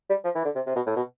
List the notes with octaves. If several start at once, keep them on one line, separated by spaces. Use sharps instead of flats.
G3
F3
E3
D3
C3
C3
B2
A2
B2